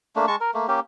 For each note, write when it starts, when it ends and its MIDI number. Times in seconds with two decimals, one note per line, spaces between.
0.16 0.26 57
0.16 0.26 58
0.16 0.26 62
0.27 0.36 56
0.27 0.36 81
0.27 0.36 85
0.41 0.51 70
0.54 0.67 57
0.54 0.67 58
0.68 0.80 58
0.68 0.80 61
0.68 0.80 67